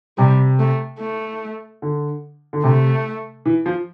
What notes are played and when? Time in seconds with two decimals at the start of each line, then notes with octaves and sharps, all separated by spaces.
0.18 C3 G3
0.59 A3
1.00 A3
1.82 D3
2.53 D3
2.64 C3 A3
3.45 E3
3.66 F3